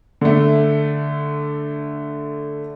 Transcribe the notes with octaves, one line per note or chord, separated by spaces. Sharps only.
D3 A3